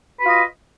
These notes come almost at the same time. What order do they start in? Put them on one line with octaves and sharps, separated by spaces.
B4 F#4 F4 D#5